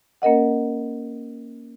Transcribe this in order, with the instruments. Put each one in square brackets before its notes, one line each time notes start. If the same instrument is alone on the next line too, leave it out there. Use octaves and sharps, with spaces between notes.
[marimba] A#3 C#4 A#4 D#5 F#5